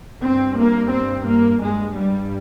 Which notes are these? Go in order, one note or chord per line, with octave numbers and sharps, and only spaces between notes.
G2 C4
A#3
C4
A#3
G2 G#3
G3